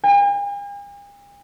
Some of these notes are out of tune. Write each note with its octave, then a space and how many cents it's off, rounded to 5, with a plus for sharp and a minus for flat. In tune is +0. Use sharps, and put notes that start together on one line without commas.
G#5 -45